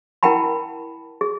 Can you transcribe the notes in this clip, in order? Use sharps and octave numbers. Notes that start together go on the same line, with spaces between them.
E4 A#4 F#5 G5 A5 B5
G#4